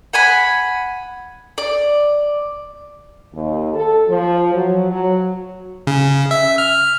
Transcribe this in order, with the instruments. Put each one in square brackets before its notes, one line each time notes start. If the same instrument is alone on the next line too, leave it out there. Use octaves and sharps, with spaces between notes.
[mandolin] F#5 G#5 B5
D5
[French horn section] D#2
A4
F3
F#3
F#3
[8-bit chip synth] C#3
E5
F6